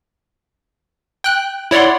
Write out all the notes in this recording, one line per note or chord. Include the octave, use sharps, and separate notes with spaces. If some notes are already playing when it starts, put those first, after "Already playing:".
G5 F#6
E4 C#5 D5 F#5 C6